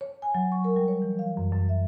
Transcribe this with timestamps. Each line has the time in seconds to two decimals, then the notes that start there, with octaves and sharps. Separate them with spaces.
0.01 C#5
0.22 G#5
0.35 F#3
0.52 C#6
0.64 A#4
0.76 G3
0.88 C#5
1.02 E3
1.19 F5
1.37 F#2
1.53 F#2
1.69 E5